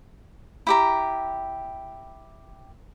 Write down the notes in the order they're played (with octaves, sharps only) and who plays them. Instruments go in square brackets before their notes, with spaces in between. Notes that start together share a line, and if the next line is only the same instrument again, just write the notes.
[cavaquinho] E4 G4 A#5